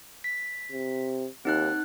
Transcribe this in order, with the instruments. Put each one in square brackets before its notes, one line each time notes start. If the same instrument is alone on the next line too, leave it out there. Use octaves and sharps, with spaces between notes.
[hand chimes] B6
[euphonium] C3
[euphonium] D#2 [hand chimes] C4 D#4 F#6